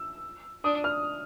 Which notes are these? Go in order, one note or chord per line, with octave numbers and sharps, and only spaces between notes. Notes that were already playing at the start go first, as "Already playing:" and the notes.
Already playing: E6
D4 D#6
F6